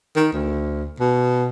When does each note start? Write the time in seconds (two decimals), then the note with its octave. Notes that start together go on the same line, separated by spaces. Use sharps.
0.16 D#3
0.33 D2
1.00 B2